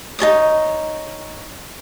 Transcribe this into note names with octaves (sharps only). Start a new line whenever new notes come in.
D#4 A4 C#5 D#6